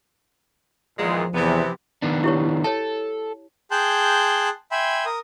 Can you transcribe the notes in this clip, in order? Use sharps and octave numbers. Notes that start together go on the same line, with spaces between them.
E2 A#2 D#3 F3 G#3
E2 C3 E3 B3
D#3 B3 D4
E4 G4 C#5
A4 C#5 A5
G#4 G5 A5 C6 F#6 G6
E5 G5 G#5 B5 C6
A#4 D#6